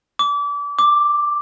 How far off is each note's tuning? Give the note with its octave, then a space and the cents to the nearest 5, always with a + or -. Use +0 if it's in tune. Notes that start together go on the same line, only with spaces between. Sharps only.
D6 -30
D6 +5